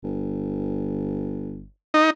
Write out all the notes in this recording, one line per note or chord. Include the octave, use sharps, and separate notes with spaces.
G1
D#4